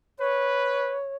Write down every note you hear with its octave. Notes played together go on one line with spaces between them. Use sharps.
B4 C#5